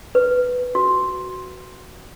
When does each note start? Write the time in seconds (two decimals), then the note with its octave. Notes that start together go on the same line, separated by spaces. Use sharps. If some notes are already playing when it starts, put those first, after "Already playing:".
0.15 B4
0.75 F#4